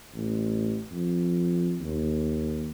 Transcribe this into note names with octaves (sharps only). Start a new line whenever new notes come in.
A1
F2
D#2